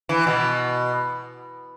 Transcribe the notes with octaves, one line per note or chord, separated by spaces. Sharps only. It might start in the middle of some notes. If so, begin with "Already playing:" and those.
E3
B2